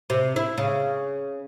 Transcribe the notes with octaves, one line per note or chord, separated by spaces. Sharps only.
C3
E4
C#3